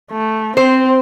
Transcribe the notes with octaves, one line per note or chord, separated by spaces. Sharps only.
A3
C4 C5